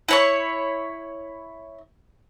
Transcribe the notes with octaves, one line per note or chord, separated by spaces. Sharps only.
E4 C#5 C#6